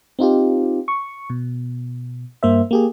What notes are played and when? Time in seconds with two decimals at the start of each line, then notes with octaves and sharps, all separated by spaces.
0.19 C4 D#4 F4 G4
0.88 C#6
1.30 B2
2.43 G2 A#3 C5 E5
2.71 A#3 G4 G#4